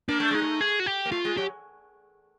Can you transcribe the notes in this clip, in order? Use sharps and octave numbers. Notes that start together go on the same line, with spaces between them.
A#3 D4
A3
G#3 D#4
A3
G#4
F#4
G4
A#3
A3 F4
G#3
F#3 G4